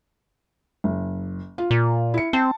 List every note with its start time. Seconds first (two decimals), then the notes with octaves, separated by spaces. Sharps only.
0.84 F#1
1.58 F4
1.71 A#2
2.14 E4 C#7
2.33 C4 A5